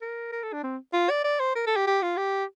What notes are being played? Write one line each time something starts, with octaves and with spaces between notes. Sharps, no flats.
A#4
A#4
A4
D4
C4
F4
D5
D5
C5
A#4
A4
G4
G4
F4
G4